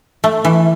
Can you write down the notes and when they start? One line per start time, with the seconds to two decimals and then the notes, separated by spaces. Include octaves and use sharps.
0.24 A3
0.45 E3